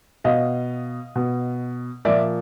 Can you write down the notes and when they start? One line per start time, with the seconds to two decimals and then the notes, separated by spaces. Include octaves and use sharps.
0.24 B2 D#5 F5
1.16 B2
2.05 A#2 F3 D5 E5